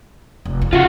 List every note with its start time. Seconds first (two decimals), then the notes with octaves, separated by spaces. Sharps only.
0.45 F1
0.62 F2
0.73 C#3 F4 F#4